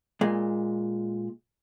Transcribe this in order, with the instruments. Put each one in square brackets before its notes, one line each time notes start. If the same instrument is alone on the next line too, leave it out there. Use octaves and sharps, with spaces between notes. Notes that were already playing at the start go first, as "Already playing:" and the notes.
[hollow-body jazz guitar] A#2 G#3